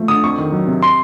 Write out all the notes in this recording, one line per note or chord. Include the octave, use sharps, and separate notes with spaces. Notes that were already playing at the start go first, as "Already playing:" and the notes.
Already playing: F3 A3
D3 D#6
F2 C#6
D#3
F#3
C3
C6